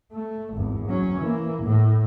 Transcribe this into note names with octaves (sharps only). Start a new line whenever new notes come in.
A3
G#1 E2
F#3 C#4
E3 A#3
A2